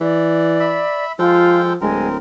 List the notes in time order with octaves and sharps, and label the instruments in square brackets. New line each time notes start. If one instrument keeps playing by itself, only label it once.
[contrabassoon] E3 [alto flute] D5
[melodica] E5 B5
[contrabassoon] F3 [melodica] G#3 A4 G5 [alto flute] F4
[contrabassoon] D1 [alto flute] G#3 [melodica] C4 A#4